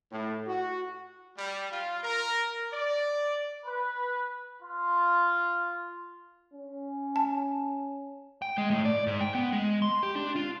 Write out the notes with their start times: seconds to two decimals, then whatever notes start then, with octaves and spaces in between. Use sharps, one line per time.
0.12 A2
0.47 F#4
1.37 G3
1.71 F4
2.03 A#4
2.71 D5
3.66 B4
4.62 F4
6.54 C#4
7.16 A5
8.42 G5
8.58 G#3
8.71 A2
8.85 D5
9.07 G#2
9.21 G5
9.35 B3
9.52 G#3
9.82 C6
10.03 G4
10.16 D4
10.36 F4